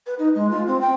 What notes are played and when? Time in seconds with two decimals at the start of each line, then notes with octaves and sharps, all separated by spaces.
0.06 B4
0.19 D#4
0.35 G#3
0.50 F4
0.67 C4
0.81 G5